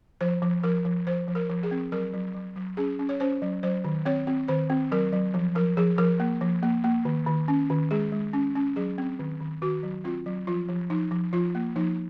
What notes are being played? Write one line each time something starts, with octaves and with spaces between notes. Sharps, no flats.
F3 C5
F3
F3 A#4
F3
F3 C5
F3
A#4
F3
G#4
C4
F#3 A#4
F#3
F#3
F#3
C#4 G#4
C#4
C#5
C#4 C5
F#3
F#3 C5
D#3
C4 C#5
C4
D#3 C5
C4
F#3 A#4
F#3
F3
F3 A#4
F3 G#4
F3 A#4
A#3
F3
A#3
A#3
D#3
D#3
C#4
D#3
G#3 G#4
G#3
C#4
C#4
F#3 G#4
C4
D#3
D#3
D#3 F#4
F#3
C4 F4
F#3
F3 F4
F3
F3 D#4
F3
F3 F4
A#3
F3 D#4